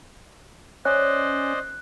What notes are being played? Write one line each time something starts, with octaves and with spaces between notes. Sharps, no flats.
C#4 C5 D5 D#5 F#6